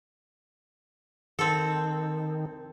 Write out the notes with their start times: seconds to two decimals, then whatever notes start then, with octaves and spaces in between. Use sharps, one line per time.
1.39 D#3 C4 A4